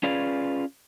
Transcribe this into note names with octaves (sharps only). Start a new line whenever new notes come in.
C#4 F4 G#4 B4 D5 F5